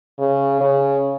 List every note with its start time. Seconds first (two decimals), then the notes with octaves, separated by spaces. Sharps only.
0.19 C#3
0.60 C#3